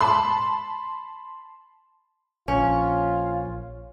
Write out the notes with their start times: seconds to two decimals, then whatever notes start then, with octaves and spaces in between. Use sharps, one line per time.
0.01 A5 B5 C6
2.48 A#1 C#4 F4